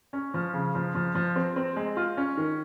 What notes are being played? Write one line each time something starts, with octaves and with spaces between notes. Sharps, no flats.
C#4
F3
C#3
F3
F3
F3
C4
C4
G#3
F4
C#4
D#3